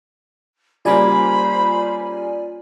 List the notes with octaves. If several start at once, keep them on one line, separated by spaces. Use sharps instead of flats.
C#3 G3 A#3 F4 C5 D5 G#5 B5